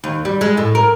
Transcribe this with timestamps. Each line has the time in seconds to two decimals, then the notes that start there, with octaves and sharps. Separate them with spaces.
0.04 D#2
0.25 G3
0.41 G#3
0.57 A2
0.75 A#4